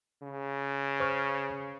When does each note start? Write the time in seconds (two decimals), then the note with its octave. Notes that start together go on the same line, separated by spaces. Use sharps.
0.22 C#3
1.00 C5 C#6 F6